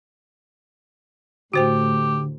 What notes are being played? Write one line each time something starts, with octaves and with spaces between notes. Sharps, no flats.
A2 D3 F#4 G4 C5 G5